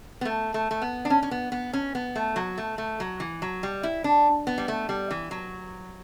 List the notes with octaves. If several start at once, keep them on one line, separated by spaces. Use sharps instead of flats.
B3
A3
A3
A3
B3
D4
C#4
C#4
B3
B3
C#4
B3
A3
F#3
A3
A3
F#3
E3
F#3
G3
E4
D4
B3
G3
A3
G3
E3
F#3